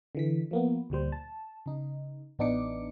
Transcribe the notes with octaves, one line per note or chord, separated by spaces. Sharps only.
D3 E3 B6
F3 A#3 B3
D2 A#2 G3 C5
A5
C#3 D#4
A1 B3 D4 D#4 D6 C#7